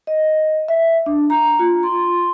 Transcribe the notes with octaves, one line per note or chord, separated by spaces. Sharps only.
D#5
E5
D4
A#5
F4
C6